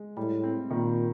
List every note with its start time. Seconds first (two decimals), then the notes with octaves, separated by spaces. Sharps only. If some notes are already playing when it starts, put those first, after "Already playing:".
Already playing: G#3
0.17 A2 G3
0.43 C4
0.70 A#2 D#3